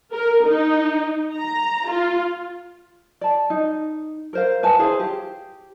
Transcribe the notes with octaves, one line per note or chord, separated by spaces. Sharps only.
A#4
D#4
A#5
F4
D5 A5
D#4
A#4 C5 F5
B4 G#5 A5
E4 G#4 C5 F5
G4